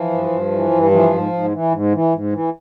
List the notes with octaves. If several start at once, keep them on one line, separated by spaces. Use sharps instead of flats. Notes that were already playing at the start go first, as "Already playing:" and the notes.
Already playing: E3 F3
G2
G2
E3
G2
E3 F3
G#2
G#2
E3
G#2
E3
G#2
E3